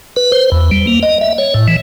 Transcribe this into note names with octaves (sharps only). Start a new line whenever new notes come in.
B4
C5
E2
G3
A#3
D#5
E5
C#5
A2
E3